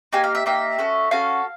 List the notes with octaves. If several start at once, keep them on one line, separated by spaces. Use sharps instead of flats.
A#3 D#4 G4 G#5
F5
E5
A#3 D#4 G4 E5
C#4 F#4 A4
C#4 F#4 A4 F5